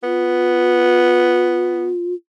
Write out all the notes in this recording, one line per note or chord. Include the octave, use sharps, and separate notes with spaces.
B3 F4